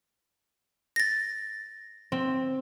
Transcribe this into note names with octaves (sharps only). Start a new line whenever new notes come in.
A6 A#6
C4